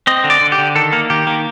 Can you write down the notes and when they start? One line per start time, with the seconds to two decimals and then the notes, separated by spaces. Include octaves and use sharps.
0.07 C4 D#5
0.24 D3
0.30 D5
0.41 D3
0.52 G4
0.58 D3
0.75 D#3 A4
0.93 A#3
1.10 D#3 G4
1.27 A#3